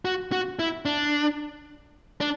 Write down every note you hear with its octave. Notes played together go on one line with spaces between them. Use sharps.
F#4
F#4
E4
D4
D4